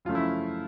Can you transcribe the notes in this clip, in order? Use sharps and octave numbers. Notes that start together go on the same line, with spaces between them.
F#2 C#3 F3 A3 C#4 F4
E4